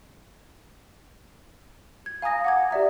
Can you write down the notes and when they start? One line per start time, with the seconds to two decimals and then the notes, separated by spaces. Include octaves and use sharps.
2.06 G#6
2.22 F5 G#5 A#5 D#6 A#6
2.44 F#5 D6 G#6
2.71 G4 D5 E5 A#5